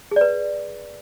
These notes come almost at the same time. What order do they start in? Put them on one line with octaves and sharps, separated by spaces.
G#4 D5 B4